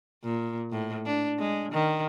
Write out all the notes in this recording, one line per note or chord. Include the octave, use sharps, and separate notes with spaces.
A#2
A2
D4
G#3
D#3